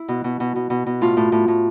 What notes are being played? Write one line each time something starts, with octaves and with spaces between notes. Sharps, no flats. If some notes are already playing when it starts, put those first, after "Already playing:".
Already playing: E4
B2
B2
B2
B2
B2
B2
A2 F4
A2
A2
A2